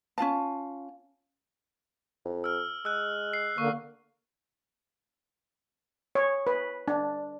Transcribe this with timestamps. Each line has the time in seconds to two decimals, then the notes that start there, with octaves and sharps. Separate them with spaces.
0.18 C#4 F4 F5 A5
2.25 F2
2.44 E6 F6
2.85 G#3 E6 F#6
3.33 C7
3.58 D3 A#3 C#6
6.15 C#5
6.47 B4
6.88 D4